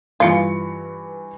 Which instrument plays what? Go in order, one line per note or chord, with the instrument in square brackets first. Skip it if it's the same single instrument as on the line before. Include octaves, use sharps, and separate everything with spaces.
[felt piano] G2 E3 C#7 [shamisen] F4